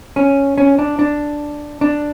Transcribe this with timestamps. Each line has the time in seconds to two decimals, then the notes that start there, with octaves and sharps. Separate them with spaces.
0.16 C#4
0.58 C#4
0.79 D4
0.99 D4
1.81 D4